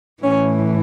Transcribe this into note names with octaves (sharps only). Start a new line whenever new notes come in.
A2 E3 C#4